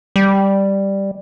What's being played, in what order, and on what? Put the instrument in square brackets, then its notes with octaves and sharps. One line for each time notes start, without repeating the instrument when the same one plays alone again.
[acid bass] G3